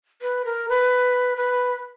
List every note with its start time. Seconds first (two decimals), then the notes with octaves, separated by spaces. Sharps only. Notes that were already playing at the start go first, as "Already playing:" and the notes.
0.22 B4
0.45 A#4
0.69 B4
1.37 B4